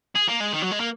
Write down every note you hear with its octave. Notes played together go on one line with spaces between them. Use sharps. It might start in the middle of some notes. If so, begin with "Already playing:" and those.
G#4
A#3
G#3
D#3
F#3
G#3
A#3